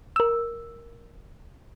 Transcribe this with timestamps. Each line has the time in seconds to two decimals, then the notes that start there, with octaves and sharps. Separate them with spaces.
0.16 A#4 E6